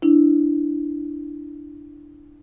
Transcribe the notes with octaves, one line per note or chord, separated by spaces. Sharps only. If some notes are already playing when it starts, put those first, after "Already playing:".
D4 E4